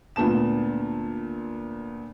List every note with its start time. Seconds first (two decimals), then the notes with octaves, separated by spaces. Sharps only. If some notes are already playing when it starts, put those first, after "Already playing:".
0.16 D2 A#2 B3 A5 E7